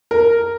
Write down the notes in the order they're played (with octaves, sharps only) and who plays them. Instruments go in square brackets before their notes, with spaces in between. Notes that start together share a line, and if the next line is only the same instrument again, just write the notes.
[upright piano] A#4